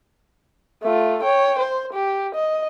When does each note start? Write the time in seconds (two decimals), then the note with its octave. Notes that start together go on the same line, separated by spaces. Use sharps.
0.82 A3 F4
1.23 C#5 G5
1.59 C5
1.93 G4
2.34 D#5